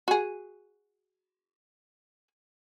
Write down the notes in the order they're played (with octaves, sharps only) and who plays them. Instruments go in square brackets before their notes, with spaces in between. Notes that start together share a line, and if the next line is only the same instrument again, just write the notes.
[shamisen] F#4 G#4